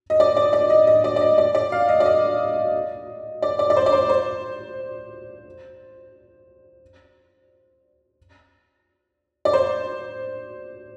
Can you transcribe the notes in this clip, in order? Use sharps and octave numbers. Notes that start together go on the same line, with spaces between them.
D#5
D5
D5
D5
D#5
D#5
D5
D5
D#5
D5
D5
F5
D#5
D5
D#5
D5
D5
D5
C5
D5
C5
C5
D5
C5